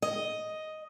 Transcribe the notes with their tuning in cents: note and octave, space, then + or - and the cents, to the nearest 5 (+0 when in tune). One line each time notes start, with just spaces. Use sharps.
D#5 +5